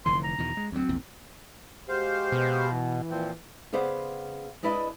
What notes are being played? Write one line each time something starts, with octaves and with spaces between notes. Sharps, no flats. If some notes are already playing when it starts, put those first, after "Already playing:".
F1 D3 E3 C6
A#5
E2 B2 D#3
G#3
D2 F#3 C4
A#1 E2 A#2
G#3 F#4 G4 C5 F5
B2
E3
A#2 F3 C4
C#3 B3 G#4 C5 D5 F#5
G#3 D4 E4 B4 D5 D#5